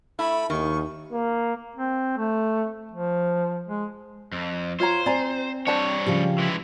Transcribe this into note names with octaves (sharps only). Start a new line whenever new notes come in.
A3 E4 B5
D#2 D#3 C#6
A#3
C4
A3
F3
G#3
F2
F4 C5 C#5 A#5
C4 D5 G#5 A#5
G3 D4 C5 C#5 A5
C#3 F3 G4
E3 G#3 E4